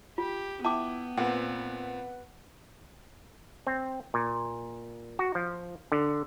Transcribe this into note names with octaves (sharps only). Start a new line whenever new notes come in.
F4 G4
B3 E4 G5 A5 D6
A#2 C4 B4 F#5
C4
A#2
F#4
F3
D3